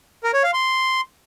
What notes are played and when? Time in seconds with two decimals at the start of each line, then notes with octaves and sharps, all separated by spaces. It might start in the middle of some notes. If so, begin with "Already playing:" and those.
0.24 A#4
0.34 C#5
0.44 F5
0.53 C6